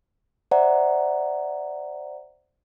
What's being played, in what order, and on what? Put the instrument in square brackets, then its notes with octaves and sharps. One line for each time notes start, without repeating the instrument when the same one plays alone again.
[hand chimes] C5 D5 E5 F#5 A#5